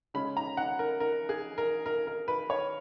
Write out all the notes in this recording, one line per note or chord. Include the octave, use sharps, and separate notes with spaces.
C#3 G#3 C#4 B5
A#5
F#5
A#4
A#4
G#4
A#4
A#4
A#4
B4
C#5